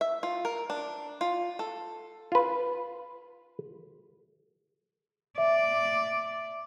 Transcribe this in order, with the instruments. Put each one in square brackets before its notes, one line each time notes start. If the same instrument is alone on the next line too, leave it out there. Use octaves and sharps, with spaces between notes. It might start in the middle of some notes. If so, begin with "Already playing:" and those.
[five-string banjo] E5
F4
A#4
D4
F4
A4
[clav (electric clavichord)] F4 B4
[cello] D5 [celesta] E5